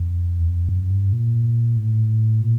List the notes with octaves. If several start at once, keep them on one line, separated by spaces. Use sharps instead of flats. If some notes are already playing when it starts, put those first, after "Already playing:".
Already playing: F2
E2
F2
F#2
G2
A#2
A2
A#2